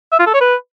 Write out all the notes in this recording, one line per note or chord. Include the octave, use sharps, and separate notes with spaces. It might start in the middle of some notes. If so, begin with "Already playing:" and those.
E5
F4
A4
C#5
B4